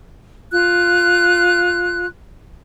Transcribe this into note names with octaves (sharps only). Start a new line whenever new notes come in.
F4 F#6